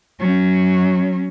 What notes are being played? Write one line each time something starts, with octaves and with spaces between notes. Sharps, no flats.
F#3 C#4